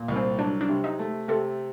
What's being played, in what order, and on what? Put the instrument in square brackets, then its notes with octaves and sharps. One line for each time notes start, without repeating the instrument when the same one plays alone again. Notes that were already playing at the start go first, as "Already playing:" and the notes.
Already playing: [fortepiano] A#2
C2
[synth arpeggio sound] C4
[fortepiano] F#3 [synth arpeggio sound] D4
[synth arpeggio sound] D4
[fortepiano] C3
[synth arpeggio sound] D#4
[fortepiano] A3
[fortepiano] C3 [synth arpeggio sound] A4